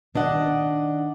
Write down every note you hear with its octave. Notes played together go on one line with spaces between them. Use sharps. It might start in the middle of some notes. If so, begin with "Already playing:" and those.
D#3 D4 D#5 F#5